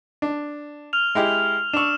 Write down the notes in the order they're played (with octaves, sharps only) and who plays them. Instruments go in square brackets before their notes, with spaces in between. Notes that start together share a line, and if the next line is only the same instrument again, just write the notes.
[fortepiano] D4
[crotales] F6 F7
[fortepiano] G#3 E4 G4
[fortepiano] D4 C#6 [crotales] E6 E7